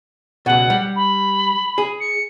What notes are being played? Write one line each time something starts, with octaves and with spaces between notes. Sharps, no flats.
C#2 B2 F#5
G3
B5
G#4
C#7